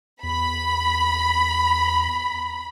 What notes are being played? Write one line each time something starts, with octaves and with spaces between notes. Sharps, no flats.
E2 B5